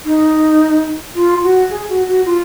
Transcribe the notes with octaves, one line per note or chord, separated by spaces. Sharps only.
D#4
F4
F#4
G#4
F#4
F#4
F4